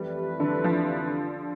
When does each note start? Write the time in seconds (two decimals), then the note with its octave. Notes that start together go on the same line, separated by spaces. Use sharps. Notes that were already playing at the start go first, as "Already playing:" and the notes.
Already playing: F2 E3 G3 A3 E4 B4
0.40 D3
0.64 F3